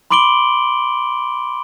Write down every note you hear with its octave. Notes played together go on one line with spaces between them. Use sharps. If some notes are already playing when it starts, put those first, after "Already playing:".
B5 C6 D6 D7 F#7 G7